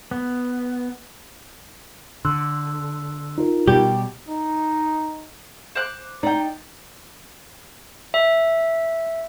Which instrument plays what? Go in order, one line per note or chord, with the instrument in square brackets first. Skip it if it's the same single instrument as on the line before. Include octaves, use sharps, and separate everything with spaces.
[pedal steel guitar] B3
[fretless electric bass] D3 [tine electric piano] C6 E6 F#6
[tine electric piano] D#4 F4 A#4
[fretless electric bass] B2 G3 [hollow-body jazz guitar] G4
[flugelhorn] D#4
[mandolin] C5 D6 F#6
[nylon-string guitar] D#4 [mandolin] D5 G5
[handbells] E5